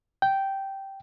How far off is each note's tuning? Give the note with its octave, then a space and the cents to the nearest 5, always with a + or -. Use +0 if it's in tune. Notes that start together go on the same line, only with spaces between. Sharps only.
G5 -10